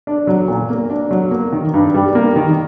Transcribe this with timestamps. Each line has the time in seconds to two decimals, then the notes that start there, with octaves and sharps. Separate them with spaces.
0.07 D4
0.27 F#3
0.48 A#2
0.70 A#3
0.90 D4
1.11 F#3
1.31 A#3
1.52 D#3
1.74 G2
1.94 G3
2.15 A#3
2.36 D#3